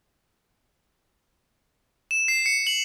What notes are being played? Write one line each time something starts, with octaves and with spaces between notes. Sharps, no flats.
E7
C7
C#7
F#7